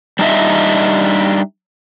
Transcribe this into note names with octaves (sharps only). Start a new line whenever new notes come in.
G3 D4 D#4 C5 D#5 E5